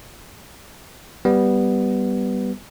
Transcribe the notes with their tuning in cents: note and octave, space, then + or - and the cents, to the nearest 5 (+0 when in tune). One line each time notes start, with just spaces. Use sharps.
G3 +0 B3 +0